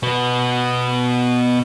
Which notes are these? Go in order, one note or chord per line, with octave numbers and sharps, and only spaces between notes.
B2 B3